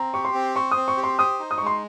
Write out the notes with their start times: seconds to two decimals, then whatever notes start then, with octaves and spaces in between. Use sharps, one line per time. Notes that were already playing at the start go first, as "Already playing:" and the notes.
Already playing: C4 A#5
0.14 G4 C#6
0.25 C6
0.34 C4
0.55 C5 C#6
0.71 D#6
0.77 C4
0.88 C#6
0.97 G4
1.04 C6
1.19 C5 D#6
1.39 D#4
1.51 D#6
1.58 C#6
1.61 G#3
1.66 C6